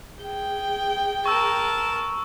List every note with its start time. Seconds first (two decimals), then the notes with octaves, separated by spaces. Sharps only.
0.20 G#4 G5
1.26 A#4 A5 C#6 E6